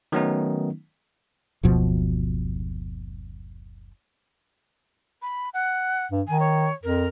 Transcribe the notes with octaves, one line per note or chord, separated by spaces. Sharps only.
D#3 F#3 A3 B3 C#4 D#4
F#1 D2 B2 F3
B5
F#5
G2
D#3 G#5
C#5
F2 A#4